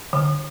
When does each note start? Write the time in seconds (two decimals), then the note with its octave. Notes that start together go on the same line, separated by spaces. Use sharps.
0.13 D3